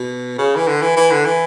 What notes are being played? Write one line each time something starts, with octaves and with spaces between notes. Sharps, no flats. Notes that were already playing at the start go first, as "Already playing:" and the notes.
Already playing: B2
C#3
E3
D3
E3
E3
D3
E3